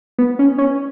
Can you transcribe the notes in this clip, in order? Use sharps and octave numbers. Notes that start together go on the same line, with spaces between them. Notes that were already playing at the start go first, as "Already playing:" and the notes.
B3
C#4
C#4